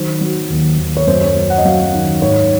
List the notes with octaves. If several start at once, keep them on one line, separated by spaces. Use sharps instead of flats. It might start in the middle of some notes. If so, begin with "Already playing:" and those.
Already playing: D#3 F#3 C5
F#3
D#2
D#2
C#5
F#2 C5
C#5
F#2
F#5
D#5
F#3 F5
D#3
G#2 C#5